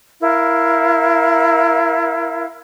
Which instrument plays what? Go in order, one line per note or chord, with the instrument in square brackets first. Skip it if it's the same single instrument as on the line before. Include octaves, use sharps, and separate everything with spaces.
[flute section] E4 A#4 F5